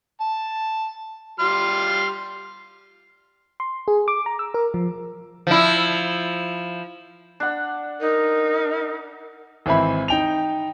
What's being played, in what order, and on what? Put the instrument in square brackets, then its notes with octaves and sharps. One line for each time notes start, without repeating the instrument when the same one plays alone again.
[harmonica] A5
G3 C6 F6
[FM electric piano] C6
G#4
D6
A#5
E6
A#4
F3
[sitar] F3 E4
[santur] D4 F#5
[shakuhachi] D#4 [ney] A#4
[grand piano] G#1 E3 C4 E4 B5
D#4 G5 F7